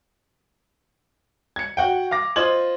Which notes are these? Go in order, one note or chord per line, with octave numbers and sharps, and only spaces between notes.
G#6 C#7
F#4 F#5 G5
F5 D6 A#6
F4 C5 D#5 G#6 F#7